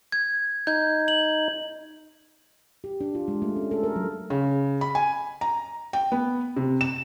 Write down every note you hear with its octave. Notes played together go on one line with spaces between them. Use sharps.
G#6
D#4 G6 G#6
F#7
G4
D4
F4
G#3
A3
C#4
A4
A#4
F#3
C#3
B5
G#5
A#5
G5
B3
C3
E7